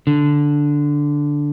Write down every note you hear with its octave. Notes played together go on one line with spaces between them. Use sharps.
D3